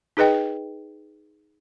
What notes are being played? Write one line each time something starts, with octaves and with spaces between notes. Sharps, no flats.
D#4 G#4 B4 D#5 G5